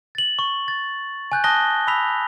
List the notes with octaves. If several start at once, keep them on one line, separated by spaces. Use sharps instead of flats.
A6 F#7
C#6
A6
G#5 F#6 G6
A5 D#6 F#6 A#6 G7
B5 E6 B6 F7